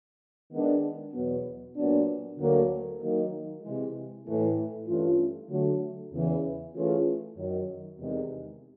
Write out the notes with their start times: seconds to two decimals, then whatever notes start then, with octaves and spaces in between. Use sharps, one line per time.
0.51 D#3 G#3 B3 D4
1.14 E2 B2 F#3 B3
1.77 A#2 F#3 B3 D4
2.39 D2 D3 F#3 A#3
3.01 D#3 F#3 A#3 D#4
3.63 C3 E3 G#3
4.26 A2 E3 A3
4.87 G2 E3 A3 C#4 F4
5.49 D3 F#3 A3
6.12 E2 C#3 E3
6.74 E3 A3 C#4 F4 G#4
7.36 F#2 D#3 F#3
7.98 E2 C3 D#3 G#3